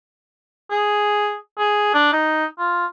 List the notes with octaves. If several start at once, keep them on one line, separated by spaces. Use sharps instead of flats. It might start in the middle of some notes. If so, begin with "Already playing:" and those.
G#4
G#4
D4
D#4
F4